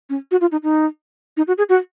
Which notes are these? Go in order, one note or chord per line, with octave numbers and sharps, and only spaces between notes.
C#4
F#4
F4
D#4
D#4
D#4
F#4
G#4
F#4